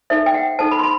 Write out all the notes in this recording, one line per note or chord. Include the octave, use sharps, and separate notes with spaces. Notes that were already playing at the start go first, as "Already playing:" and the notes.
D#4 A4 C5 E5
G5
F#5
D#4 A4 C5 A5
B5
C6
B5